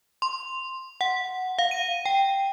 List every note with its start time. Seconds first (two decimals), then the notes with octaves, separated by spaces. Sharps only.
0.22 C6
1.01 F#5
1.59 F5
1.71 D#7
2.05 G5